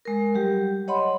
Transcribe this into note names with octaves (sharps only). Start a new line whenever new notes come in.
G#3 A#4
F#3 G3 G4
C#5 D#5 F#5 B5 C6